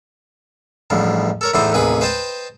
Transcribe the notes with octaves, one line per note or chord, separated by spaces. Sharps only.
A1 E2 G2 F3
A4 A#4 C#5
E2 A2 E3 A3 D#4 C5
A1 D#2 C3 G#4 B4 B5
B4 C5 D#5 G5 A5 C6